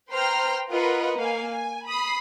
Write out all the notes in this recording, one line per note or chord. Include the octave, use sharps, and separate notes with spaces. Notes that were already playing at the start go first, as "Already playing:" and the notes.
B4 C5 G5 A#5 C6 F6
F4 A#4 B4 D#5 F#5
A#3 F5 G#5
G#5
B5 D#6 C7